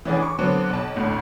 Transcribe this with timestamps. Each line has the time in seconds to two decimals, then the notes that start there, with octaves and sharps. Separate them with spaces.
0.05 E3 C#4 D4 G#4
0.20 C#6 D6
0.39 D3 F#3 B3 C4
0.70 B1 A5
0.96 A1 D2 A2